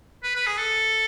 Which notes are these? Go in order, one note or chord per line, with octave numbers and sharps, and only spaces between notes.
B4
B4
G#4
A4